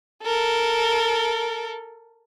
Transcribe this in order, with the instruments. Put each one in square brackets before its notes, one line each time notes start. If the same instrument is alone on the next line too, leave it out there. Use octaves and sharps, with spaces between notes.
[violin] A4 A#4